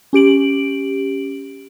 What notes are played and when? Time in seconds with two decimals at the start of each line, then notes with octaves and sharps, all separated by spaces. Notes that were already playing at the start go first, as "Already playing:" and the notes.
0.13 C#4 G4 D7 F#7